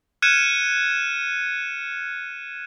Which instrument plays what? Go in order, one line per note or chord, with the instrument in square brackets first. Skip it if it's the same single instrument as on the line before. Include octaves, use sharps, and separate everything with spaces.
[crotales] F6 F#6 G#6 C#7 D#7 E7